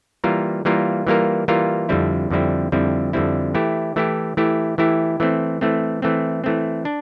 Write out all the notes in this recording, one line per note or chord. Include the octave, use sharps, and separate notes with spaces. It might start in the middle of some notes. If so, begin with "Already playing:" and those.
E3 G3 A#3 F4 A#4
E3 G3 A#3 F4 A#4
E3 G3 A#3 F4 A#4
E3 G3 A#3 F4 A#4
F2 D3 G3 C4 E4
F2 D3 G3 C4 E4
F2 D3 G3 C4 E4
F2 D3 G3 C4 E4
E3 A3 E4 G4
E3 A3 E4 G4
E3 A3 E4 G4
E3 A3 E4 G4
E3 A3 C4
E3 A3 C4
E3 A3 C4
E3 A3 C4
D4